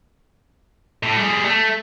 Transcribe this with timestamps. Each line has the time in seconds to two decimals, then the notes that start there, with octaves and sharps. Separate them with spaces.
1.03 A2
1.17 G3 G#4
1.45 A3